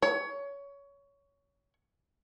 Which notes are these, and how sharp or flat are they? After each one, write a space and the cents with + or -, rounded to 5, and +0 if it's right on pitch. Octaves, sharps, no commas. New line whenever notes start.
C#5 +20